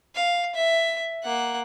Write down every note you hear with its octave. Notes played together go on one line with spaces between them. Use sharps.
F5
E5
A#3 F#5